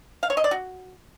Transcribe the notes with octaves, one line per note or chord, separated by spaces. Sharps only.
F5
C#5
D#5
D5
F#4